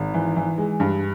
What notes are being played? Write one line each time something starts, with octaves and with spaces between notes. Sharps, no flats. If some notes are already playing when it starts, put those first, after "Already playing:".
Already playing: G#1
E3
E3
G#3
G2